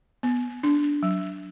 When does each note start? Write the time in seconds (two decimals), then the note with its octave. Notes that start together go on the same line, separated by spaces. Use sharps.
0.23 B3
0.63 D4
1.03 F#3